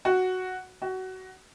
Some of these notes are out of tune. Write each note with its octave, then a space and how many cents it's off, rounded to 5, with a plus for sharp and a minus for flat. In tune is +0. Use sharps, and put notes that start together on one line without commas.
F#4 +0
F#4 +20